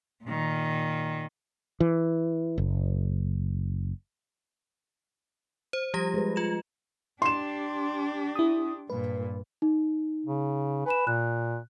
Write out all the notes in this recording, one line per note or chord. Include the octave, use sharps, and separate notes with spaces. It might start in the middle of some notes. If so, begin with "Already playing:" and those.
A#2 D#3
E3
F#1
C5
F3 G3 G4 A#6
G#3 G#4 B4
F4 E7
D4 G4 C6 E7
E4 D#6
G2 A#2 B4
D#4
C#3
B4 G#5 B5 E7
A#2 F#6